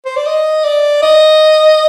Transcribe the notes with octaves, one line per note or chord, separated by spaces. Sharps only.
C5
D5
D#5
D5
D#5